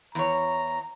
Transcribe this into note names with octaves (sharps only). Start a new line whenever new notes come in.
E2 C#5 A#5